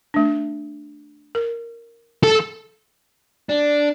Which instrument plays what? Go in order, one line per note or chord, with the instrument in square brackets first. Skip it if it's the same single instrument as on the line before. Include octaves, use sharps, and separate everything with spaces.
[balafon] A3 D4
A#4
[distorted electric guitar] A4
[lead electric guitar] D4